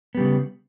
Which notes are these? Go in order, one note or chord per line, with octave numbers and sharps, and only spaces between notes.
C#3 G3 B3